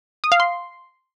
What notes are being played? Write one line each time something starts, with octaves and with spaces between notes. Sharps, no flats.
D#6
F5
C6